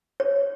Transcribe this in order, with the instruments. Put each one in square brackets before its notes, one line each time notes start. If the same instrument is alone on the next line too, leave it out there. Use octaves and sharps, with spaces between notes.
[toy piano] C#5